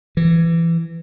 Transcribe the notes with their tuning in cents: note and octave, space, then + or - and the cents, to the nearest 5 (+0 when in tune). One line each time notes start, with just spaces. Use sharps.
E3 +20